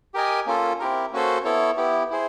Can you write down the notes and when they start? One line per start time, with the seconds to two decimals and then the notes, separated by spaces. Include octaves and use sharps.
0.14 G4 A#4 D#5 G#5
0.46 A#3 C#4 F4 A4
0.80 C4 E4 G4 A#4
1.12 A#3 C#4 F#4 A4 C5
1.44 B3 E4 A4 C#5
1.77 B3 E4 G4
2.10 E4 G#4 C5